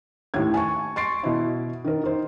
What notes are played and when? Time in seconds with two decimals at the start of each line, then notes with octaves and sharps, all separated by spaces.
0.34 D#2 A2 G#6
0.54 G#5 A5 C#6
0.96 C6 C#6 A6 C7 D7
1.23 B2 E4
1.84 D#3 A#4
2.04 D#3 C5